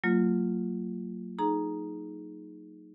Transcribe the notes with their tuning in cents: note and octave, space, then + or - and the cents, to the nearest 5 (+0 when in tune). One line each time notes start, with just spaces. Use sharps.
F#3 +0 A#3 -40 F4 +0
D#4 +0 G#4 +20 A#5 +5